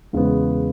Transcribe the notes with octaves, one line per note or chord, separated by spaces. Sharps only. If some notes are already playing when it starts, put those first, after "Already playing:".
E2 C#3 G#3 B3